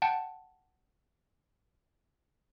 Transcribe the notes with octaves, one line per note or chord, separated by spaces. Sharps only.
F#5 G5 A5